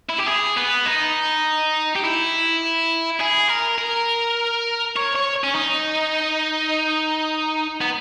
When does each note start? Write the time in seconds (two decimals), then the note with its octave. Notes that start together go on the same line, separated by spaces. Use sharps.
0.10 E4
0.19 G4
0.27 G#4
0.57 B3
0.86 D#4
1.95 G4
2.03 E4
3.21 G#4
3.49 A#4
3.78 A#4
4.97 C#5
5.16 C#5
5.44 C#4
5.55 D#4
7.81 B3